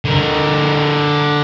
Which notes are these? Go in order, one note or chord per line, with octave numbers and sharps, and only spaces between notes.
D3 A#4